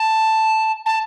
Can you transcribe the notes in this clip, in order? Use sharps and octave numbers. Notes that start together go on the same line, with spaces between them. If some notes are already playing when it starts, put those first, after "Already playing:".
Already playing: A5
A5